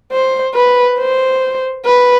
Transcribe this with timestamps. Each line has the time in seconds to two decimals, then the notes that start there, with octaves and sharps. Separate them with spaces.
0.12 C5
0.55 B4
0.98 C5
1.86 B4